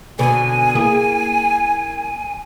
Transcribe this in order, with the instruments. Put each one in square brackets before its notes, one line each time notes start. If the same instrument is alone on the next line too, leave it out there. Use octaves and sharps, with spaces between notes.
[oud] B2 D3 [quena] G#5
[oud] A#3 E4 G#4